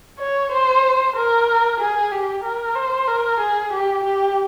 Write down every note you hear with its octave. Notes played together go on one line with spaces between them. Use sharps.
C#5
C5
A#4
G#4
G4
A#4
C5
A#4
G#4
G4
G4